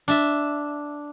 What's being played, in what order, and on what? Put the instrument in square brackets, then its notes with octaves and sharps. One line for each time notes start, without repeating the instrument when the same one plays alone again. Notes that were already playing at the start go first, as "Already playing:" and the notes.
[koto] D4 E5